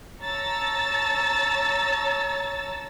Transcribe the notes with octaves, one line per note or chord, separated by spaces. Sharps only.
C#5 A5 A#5 E6 A6